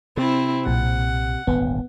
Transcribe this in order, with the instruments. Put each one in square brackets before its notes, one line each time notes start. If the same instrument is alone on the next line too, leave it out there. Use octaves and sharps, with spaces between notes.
[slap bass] C3 [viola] C4 E4
[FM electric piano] B1 A#2 [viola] F#5
[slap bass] D#1 G#1 D2 [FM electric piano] B3